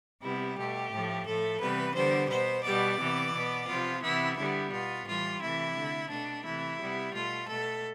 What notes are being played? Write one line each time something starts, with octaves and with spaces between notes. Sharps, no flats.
C3 G3 B3 E4
B2 A3 G4
A2 F3 A3
A2 F3 A3 A4
C3 E3 G3 B3 B4
D3 G3 B3 C5
B2 B3 C5
B2 G3 B3 D5
C3 E3 B3
B2 B3
C3 F3 B3 F4
C3 E3 B3 E4
D3 G3 B3 E4
B2 B3 F4
A2 E3 G3 F4
C3 E3 A3 E4
D3 A3
B2 A3 D4
C3 E3 A3 E4
C3 G3 B3
B2 A3 F4
B2 A3 A4